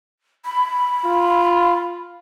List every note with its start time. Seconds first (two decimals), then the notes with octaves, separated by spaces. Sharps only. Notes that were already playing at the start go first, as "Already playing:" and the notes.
0.45 B5
1.05 F4